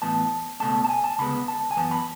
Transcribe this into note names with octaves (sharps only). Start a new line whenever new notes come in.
A2 E3 B3 A5
C#2 B2 A3 C#4 A5
A5
G#5
A5
D2 C#3 G#3 B3 B5
A5
G#5
F#2 E3 B3 A5
B5